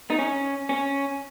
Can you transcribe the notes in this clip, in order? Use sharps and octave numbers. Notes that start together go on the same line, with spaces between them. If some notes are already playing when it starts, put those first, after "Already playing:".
D#4
C#4
C#4